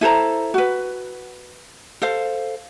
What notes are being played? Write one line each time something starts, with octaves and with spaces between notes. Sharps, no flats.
E4 A4 C5 A#5
F#4 B4
A4 C5 F5